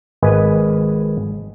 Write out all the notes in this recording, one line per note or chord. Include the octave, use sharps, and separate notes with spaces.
G#1 B4 D#5 G#5